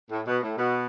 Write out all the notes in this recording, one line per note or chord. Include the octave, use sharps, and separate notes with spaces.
A2
B2
A2
B2